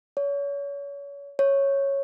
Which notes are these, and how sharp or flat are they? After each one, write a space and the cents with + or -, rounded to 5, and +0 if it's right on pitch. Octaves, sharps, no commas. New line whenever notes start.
C#5 +30
C#5 -5